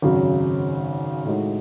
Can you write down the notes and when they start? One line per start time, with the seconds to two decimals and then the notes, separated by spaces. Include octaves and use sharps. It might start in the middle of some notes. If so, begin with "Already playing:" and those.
0.02 G#1 F#2 C#3 F#3
1.25 A2 G#3 D#4 F#4